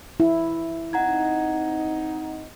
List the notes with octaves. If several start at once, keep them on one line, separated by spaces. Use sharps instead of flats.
E4
C4 D#4 F#5 A#5 G#6